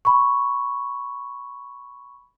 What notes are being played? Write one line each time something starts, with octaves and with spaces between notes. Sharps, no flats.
B5 C#6